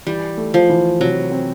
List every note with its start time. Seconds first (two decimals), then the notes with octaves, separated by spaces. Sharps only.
0.07 E3 G3
0.37 A3
0.54 F3
0.70 E3
1.00 C3 F#3
1.32 C4